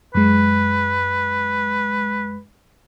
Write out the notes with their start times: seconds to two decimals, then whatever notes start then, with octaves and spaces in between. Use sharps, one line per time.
0.15 F#2 G#3 B4